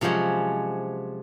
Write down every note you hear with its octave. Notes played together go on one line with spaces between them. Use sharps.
C3 F3 F#3 G#3 C#4